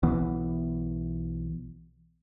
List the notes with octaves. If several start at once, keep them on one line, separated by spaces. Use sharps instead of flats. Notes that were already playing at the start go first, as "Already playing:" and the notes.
B1 E3 B3